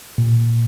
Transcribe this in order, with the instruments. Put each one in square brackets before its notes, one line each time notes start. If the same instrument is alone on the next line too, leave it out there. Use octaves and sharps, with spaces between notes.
[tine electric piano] A#2